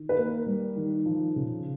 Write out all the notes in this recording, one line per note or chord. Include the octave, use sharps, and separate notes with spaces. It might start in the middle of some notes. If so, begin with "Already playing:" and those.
Already playing: D#3
B4
A#3 A#4
G3
D#3
F3
C#3